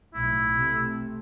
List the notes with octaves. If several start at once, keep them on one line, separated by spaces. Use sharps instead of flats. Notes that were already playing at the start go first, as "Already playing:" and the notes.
B1 A2 E4
C3 A3